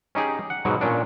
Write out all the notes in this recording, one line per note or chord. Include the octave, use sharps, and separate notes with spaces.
C#4 D#4 G4 G#4
F#5
G#2 B2 F#3
A#2 C#4 D4